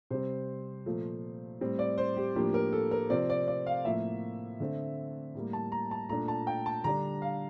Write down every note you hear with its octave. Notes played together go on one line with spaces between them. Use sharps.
C3 G3 C4 C5
A#2 F3 A3
A2 G3 C4
D5
C5
G4
A2 F3 A#3 D4 G4
A#4
A4
A#4
C3 F3 C4 D5
D5
D5
F5
A2 F3 A#3 E5
D3 A3 C4
A2 G3 A#3
A5
A#5
A5
A#2 A3 D4 A#5
A5
G5
A5
D3 G3 D4 A#5
F5